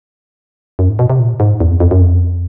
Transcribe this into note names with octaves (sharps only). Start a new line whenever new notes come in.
F#2
G#2
B2
C3
A#2
G#2
E2
F2
F2
F#2
F2